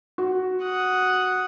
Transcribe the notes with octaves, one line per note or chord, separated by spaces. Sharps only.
F#4
F#5 D#6